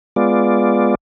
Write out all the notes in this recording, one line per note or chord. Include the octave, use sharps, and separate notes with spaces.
G#3 B3 F4 D5